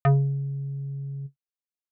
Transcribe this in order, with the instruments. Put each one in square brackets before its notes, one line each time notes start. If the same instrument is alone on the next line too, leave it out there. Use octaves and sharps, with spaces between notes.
[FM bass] C#3